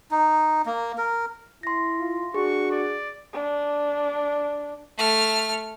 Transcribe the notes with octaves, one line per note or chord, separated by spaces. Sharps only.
D#4
A#3
A#4
E4 C6 A#6
F4
D4 F#4 G#4 C#6
D5
D4
A3 F6